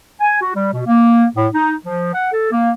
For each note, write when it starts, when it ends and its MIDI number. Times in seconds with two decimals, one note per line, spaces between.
0.21 0.37 80
0.41 0.54 66
0.56 0.70 55
0.72 0.81 47
0.87 1.26 58
1.35 1.47 45
1.54 1.74 63
1.84 2.10 53
2.14 2.31 78
2.32 2.50 69
2.52 2.71 58